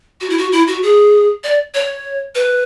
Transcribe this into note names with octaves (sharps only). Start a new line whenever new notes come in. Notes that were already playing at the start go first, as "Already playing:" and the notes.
F#4
E4
F#4
E4
F#4
G#4
D5
C#5
B4